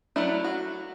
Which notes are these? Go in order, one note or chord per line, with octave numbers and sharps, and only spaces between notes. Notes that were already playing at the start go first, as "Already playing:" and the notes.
F#3 A3 D4 E4
F#4